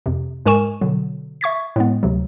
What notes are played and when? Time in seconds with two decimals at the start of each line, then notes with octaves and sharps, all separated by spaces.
0.06 F2 C3
0.46 G#2 G#3 A#4 G#5 C#6 E7
0.81 B2 D3 F#3
1.41 E5 C#6 G#6 B6
1.76 A2 G#3 B3
2.03 D2 C3 F#3